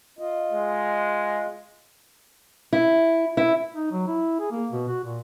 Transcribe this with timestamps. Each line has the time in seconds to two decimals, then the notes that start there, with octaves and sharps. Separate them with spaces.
0.19 F4 D#5
0.51 G#3
2.73 E4
3.37 E4
3.75 D#4
3.92 F#3
4.08 E4
4.40 G#4
4.52 A#3
4.72 B2
4.88 F#4
5.04 A#2